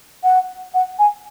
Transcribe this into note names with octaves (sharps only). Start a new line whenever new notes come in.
F#5
F#5
G#5